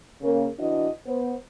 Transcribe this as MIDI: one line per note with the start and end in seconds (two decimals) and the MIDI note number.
0.21 0.46 49
0.21 0.46 58
0.58 0.88 52
0.58 0.88 62
0.58 0.88 66
0.58 0.88 75
1.07 1.35 59
1.07 1.35 72